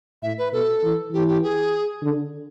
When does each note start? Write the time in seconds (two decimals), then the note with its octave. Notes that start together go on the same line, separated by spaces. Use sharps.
0.23 A2 E5
0.38 B4
0.53 B2 A4
0.83 E3
1.13 E3 G4
1.28 G4
1.43 G#4
2.03 D3